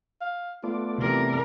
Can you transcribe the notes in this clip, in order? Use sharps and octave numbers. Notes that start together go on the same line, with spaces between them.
F5
A3 B3 F4 D5
C3 E3 A#4